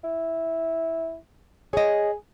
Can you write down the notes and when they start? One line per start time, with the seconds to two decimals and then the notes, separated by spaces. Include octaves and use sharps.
0.04 E4
1.73 G#4 C#5 D#5